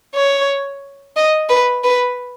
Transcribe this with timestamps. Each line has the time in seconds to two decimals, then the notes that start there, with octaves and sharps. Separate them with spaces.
0.15 C#5
1.16 D#5
1.49 B4
1.84 B4